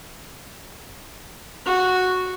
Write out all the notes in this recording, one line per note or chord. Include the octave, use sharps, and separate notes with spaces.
F#4